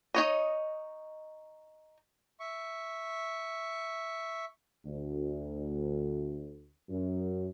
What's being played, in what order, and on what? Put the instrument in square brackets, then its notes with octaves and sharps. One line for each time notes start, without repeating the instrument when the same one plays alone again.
[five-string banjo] D#4 C#5 D#5
[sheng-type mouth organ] E5 C#6
[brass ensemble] D2
F#2